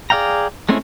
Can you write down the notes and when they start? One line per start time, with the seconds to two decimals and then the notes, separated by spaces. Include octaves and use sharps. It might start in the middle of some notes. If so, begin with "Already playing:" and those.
0.10 G#4 D5 F5 G5 A#5
0.69 G#3 A3 C4 C#4 E4